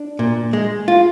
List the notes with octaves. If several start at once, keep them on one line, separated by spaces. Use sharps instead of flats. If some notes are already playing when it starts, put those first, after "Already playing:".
Already playing: D4
A#2
G#3
F4